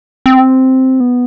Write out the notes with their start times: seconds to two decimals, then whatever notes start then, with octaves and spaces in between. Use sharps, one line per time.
0.26 C4
1.00 B3